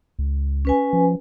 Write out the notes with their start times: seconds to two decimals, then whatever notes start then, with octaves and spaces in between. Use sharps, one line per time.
0.19 C#2
0.65 C#4 B4 G#5
0.93 F3